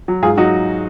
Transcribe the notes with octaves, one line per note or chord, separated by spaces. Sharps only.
F#3
G#2 F4 G#4
F#3 D#4 F#4